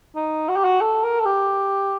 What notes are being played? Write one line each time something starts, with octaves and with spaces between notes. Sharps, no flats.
D#4
F#4
G4
F#4
A4
A#4
A4
G4